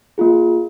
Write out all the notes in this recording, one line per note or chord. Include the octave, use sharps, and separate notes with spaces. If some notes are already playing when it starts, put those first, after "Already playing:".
A#3 F4 G#4